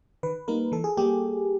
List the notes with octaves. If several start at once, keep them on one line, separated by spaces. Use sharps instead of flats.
D#3 B4
G3 A#3 D#4 A#4
E3 A4
G#4
G3 A#3 G4